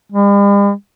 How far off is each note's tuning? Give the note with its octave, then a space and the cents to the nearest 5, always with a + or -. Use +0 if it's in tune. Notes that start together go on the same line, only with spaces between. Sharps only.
G3 +45